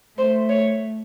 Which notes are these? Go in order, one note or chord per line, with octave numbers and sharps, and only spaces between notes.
A3 C5
C#5